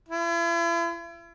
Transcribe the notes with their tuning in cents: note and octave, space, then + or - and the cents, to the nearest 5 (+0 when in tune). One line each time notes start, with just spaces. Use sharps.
E4 +45